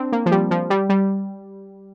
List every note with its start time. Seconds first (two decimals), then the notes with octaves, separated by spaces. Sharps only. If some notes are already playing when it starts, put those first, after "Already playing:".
Already playing: C4 D4
0.12 A#3
0.26 F3
0.31 G3
0.51 F3
0.70 G3
0.89 G3